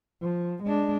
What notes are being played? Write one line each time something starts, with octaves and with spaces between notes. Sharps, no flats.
F3
G#3 D4